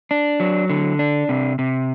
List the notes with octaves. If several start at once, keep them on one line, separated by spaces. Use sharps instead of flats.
D4
F#3
D3
D4
C3
C3